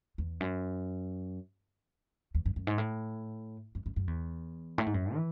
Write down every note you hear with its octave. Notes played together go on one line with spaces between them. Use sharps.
E2
F#2
E2
F#2
F#2
G#2
A2
F#2
F#2
F#2
E2
A2
G#2
F#2
E3